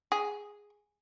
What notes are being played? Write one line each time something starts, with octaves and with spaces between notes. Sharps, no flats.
G#4